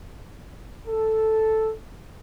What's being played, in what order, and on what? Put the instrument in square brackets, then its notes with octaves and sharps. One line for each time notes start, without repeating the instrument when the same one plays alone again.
[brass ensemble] A4